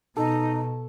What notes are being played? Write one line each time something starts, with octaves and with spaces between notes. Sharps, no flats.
B2 D#4 A4